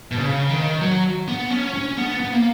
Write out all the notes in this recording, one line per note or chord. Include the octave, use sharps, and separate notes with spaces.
B2
C#3
D#3
F#3
B3
C#4
C#4
B3
B3
A#3